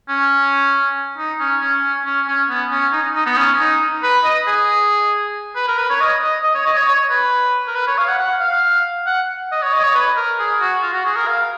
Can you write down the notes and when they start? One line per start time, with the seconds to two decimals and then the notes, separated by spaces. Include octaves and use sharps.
0.09 C#4
1.18 D#4
1.40 C#4
1.61 C#4
2.05 C#4
2.28 C#4
2.49 B3
2.71 C#4
2.92 D#4
3.15 D#4
3.26 B3
3.37 C#4
3.59 D#4
4.03 B4
4.24 D#5
4.47 G#4
5.56 B4
5.68 A#4
5.78 B4
5.90 C#5
6.01 D#5
6.22 D#5
6.43 D#5
6.55 C#5
6.66 D#5
6.77 C#5
6.87 C#5
7.10 B4
7.68 A#4
7.75 B4
7.87 C#5
7.98 F5
8.08 F#5
8.19 F#5
8.41 F5
9.07 F#5
9.52 D#5
9.62 C#5
9.73 D#5
9.83 C#5
9.95 B4
10.16 A#4
10.39 G#4
10.61 F#4
10.82 F4
10.93 F#4
11.05 G#4
11.16 A#4
11.27 F5